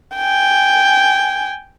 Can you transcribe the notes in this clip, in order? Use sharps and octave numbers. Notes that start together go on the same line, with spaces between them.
G5 G#5